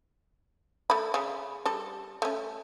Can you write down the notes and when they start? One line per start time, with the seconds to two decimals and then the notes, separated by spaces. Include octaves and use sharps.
0.90 A3 B5
1.14 C#3
1.65 G3 A4
2.22 A3 C#4